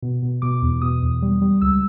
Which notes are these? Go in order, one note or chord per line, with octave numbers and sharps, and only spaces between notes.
B2
B2
B2 D6
E2
B2 D#6
E2
G3
G3
C#2 E6